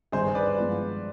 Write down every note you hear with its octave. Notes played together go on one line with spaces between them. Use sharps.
G1 G2 D#3 G#4 C5
B4 D5
G2 F3 G#3 B3 F4